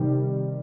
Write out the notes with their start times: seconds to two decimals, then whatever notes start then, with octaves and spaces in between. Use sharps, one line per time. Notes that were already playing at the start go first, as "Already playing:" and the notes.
Already playing: C3 D#3 G3